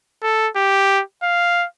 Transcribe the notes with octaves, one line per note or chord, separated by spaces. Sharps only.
A4
G4
F5